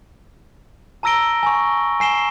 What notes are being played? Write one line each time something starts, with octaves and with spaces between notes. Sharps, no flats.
A5 A#5 E6 A#6 D7 G7
G#5 C#6
G#5 C7 E7 G7